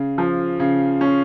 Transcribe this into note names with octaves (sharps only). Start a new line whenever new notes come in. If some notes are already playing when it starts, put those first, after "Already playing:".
Already playing: C#3
F3
C#3
C#4